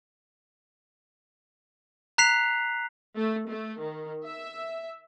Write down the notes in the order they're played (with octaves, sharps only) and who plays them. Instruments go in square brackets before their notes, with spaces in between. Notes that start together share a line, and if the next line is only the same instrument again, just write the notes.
[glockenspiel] A#5 F#6 B6 C7 F7
[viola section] A3
A3
D#3
E5